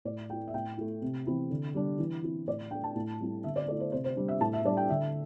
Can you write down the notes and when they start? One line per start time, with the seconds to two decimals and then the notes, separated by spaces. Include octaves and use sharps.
0.05 A2 D5
0.29 A3 G5
0.32 E4
0.48 E5
0.54 A2 G5
0.78 A3 E4
1.02 C3
1.27 E3 C4 E4
1.50 D3
1.74 G3 D4
1.99 E3
2.23 C4 E4
2.47 A2 D5
2.71 A3 D4 G5
2.84 A5
2.95 A2
3.20 G3 C4 E4
3.44 D3 E5
3.56 D5
3.68 A3 D5
3.72 E4
3.80 C5
3.92 C3 C5
4.04 C5
4.16 G3 D4
4.28 E5
4.41 A2 A5
4.53 E5
4.65 G3 D4 D5
4.77 G5
4.90 D3 E5